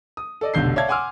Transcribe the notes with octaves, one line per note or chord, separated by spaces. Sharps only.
D#6
A4 D5 D#5
F1 B1 D3 G6 C7
C#5 D5 E5 F5 A5 G#6
F#5 G#5 C6 D6 E6 F6